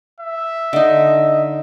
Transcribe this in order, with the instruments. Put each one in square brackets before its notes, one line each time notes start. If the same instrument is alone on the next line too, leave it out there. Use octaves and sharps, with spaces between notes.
[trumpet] E5
[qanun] D3 D#4 [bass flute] D#5